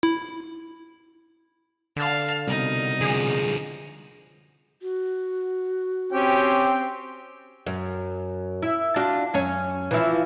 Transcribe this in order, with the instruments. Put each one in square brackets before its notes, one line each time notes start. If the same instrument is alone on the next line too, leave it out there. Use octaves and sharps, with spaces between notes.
[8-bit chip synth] E4
[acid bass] D3 [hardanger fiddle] F5 A5
[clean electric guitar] C2 B2 [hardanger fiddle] D#4
[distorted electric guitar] D3 F3 [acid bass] G#4
[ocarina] F#4
[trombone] C4 [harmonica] C#4 G4 [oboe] G5
[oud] F#2
E4
D4 F4 F#4
F#2 C#4 C#5
E3 F3 E4